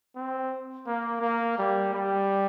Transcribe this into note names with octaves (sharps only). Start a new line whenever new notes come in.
C4
A#3
A#3
G3
G3